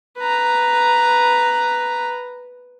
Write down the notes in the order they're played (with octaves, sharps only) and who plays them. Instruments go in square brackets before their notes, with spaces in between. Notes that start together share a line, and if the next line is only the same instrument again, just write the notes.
[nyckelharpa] B4 A#5